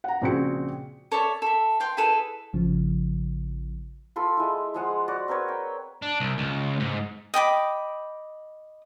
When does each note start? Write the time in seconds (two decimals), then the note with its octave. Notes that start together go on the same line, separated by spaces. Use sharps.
0.04 F#5 A#5
0.22 A#1 C#3 C4 F#4 G#4 C#7
1.12 A4 C#5 D5 E5
1.42 A4 E5
1.80 F5 G5 C6
1.97 E4 G#4 A4 B4
2.53 A1 C#3 F3
4.16 F4 A4 B5 C6
4.37 G#3 E4
4.74 F3 G#3 F#5
5.08 F#4 D5
5.28 C4 A#4 B4 C#5
5.48 G5
6.02 D4
6.20 C2
6.38 C#2
6.80 G#2
7.34 D#5 G5 B5 D6